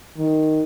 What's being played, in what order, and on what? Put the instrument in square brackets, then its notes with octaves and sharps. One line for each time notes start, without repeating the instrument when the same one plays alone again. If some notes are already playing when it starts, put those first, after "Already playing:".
[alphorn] D#3